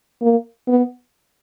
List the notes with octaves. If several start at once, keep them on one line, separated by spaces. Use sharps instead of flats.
A#3
B3